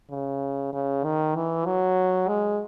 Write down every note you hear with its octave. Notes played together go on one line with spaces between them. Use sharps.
C#3
C#3
D#3
E3
F#3
G#3